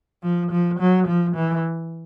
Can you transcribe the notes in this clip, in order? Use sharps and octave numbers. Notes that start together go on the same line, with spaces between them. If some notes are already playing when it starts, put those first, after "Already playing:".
F3
F3
F#3
F3
E3